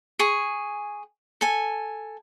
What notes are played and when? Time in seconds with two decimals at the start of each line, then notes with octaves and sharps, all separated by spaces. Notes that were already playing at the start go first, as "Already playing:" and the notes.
0.19 G#4 G#5 C#6
1.41 A4 G#5